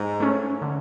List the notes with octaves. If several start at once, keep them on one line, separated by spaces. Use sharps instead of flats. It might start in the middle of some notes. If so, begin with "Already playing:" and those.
Already playing: G#2
A3 C#4
D3